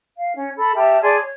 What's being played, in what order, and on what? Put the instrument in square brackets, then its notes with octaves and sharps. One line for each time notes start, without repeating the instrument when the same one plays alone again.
[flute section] F5
C#4
A4 B5
G4 E5 A5 F6
G#4 D5 A5 C6
C#5